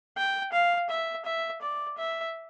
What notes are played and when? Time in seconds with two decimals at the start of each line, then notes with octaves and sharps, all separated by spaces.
0.17 G5
0.52 F5
0.89 E5
1.25 E5
1.62 D5
1.98 E5